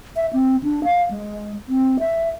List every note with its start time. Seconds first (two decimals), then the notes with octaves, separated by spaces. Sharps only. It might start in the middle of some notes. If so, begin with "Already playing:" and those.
0.16 E5
0.33 C4
0.63 D4
0.84 F5
1.11 G#3
1.68 C4
2.00 E5